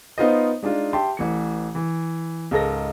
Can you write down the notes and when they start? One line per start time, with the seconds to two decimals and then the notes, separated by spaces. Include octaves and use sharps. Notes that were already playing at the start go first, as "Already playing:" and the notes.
0.18 B3 D#4 F4 C5 D#5
0.63 G#3 D4 D#4 F4
0.93 G4 E5 A5 C6
1.17 A1 E3 C#7
1.75 E3
2.51 C#2 G#2 A4 A#4 A#6